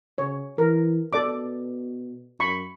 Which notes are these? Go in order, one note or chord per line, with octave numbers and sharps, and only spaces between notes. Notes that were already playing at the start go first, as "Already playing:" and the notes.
C#3 C#5
E3 A#4
B2 A4 D5 D6
F#2 B5 C#6